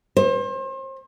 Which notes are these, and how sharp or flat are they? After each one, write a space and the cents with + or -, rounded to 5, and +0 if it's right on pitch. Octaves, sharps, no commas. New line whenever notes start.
C5 +35